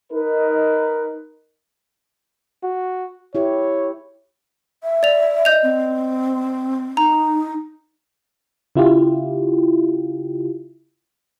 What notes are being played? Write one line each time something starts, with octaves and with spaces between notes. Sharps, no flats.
D#4 A#4 B4
F#4
E4 G4 C#5
E5
D5 F7
D#5 G6 F7
C4
D#4 A#5
C#3 E4 F4 G4